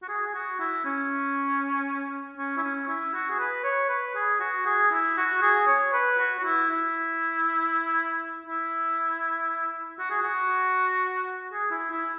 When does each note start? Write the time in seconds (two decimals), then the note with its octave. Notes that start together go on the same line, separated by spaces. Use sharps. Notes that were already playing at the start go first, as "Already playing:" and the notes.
0.02 F#4
0.09 G#4
0.26 G#4
0.34 F#4
0.60 E4
0.85 C#4
2.37 C#4
2.57 E4
2.63 C#4
2.88 E4
3.14 F#4
3.30 G#4
3.40 B4
3.64 C#5
3.89 B4
4.15 G#4
4.40 F#4
4.66 G#4
4.91 E4
5.17 F#4
5.42 G#4
5.68 C#5
5.93 B4
6.19 F#4
6.39 F#4
6.44 E4
6.70 E4
8.47 E4
9.99 F#4
10.11 G#4
10.22 F#4
11.52 G#4
11.71 E4
11.91 E4